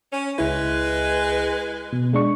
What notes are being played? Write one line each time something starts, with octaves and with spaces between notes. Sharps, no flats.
C#4
C#2 G#3 E4 B4
B2
G#3 D4 C#6